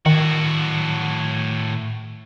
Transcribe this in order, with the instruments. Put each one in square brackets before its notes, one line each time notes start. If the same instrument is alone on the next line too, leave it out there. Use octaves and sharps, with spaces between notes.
[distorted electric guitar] A2 F#4 [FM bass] D#3